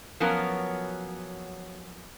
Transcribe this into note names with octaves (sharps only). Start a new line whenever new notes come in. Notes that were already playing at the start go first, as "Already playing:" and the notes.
F3 F#3 B3 C#4 F#4 A#4